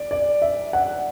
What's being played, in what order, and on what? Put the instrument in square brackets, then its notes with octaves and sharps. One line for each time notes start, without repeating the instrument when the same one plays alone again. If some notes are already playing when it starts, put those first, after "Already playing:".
Already playing: [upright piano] D5
D5
E5
F#5